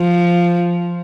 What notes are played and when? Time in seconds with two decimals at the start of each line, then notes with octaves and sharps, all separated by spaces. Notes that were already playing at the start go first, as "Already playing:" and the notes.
Already playing: F3